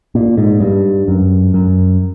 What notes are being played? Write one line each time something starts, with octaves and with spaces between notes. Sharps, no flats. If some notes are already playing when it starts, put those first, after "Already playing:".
A#2
G#2
G2
F#2
F#2